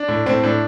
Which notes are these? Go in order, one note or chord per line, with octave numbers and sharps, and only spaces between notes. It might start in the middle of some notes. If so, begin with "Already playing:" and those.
Already playing: D4
A2
A2 C4
A2 D4